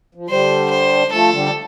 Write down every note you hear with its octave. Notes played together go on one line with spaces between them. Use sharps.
F3
D3 G3 C5
C5
F3 A3 A4
D3 G3